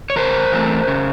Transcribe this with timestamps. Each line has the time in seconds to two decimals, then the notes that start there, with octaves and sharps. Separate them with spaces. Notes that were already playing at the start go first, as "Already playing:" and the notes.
0.10 C#5
0.16 C#3 A#4 C5
0.52 E3 A3 C4
0.87 C#3